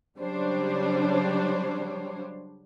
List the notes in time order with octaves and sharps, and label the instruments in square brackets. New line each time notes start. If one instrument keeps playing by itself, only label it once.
[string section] C#3 F#3 G3 D4 C5 C#5